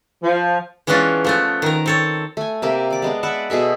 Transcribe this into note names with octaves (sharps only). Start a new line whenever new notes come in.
F3
E3 G#3 B3 C#4 D4 F4
F3 A3 B3
D#3 A#4
C4 A4 C#5
A3 G#5
C3 A#3 G4 E5
D5 D6
G#3 B3 D4
B4 D5 E5 F#5
B2 G#4 A4 E5